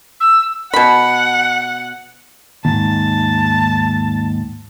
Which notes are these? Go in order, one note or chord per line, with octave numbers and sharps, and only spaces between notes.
E6
B2 F#5 B5
D#2 G#2 A5